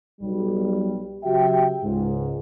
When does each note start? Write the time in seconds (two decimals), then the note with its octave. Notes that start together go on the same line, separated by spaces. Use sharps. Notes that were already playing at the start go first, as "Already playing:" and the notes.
0.21 B1 G3
1.24 C#3 F#3 F#4 G4 E5 G5
1.83 C#2 G#2